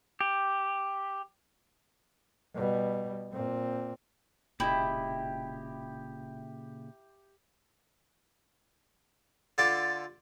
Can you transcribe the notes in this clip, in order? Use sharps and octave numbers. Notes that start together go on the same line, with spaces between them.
G4
B2 G3
A#2 C4
E1 A#2 C#3 E4 G4 D#5
D3 F4 A4 D5 C6